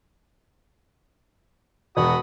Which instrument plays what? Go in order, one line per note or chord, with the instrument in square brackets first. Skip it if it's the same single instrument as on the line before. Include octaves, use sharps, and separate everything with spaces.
[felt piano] E1 [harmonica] F#4 B5 D#6